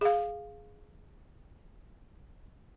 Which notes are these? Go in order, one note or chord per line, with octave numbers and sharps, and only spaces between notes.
G#4 F5